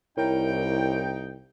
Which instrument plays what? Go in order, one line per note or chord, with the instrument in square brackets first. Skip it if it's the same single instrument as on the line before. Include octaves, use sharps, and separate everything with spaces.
[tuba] C2 [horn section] D#4 G5 [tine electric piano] E4 A#4 C#5